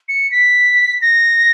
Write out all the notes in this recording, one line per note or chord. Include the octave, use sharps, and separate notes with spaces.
C#7
B6
A#6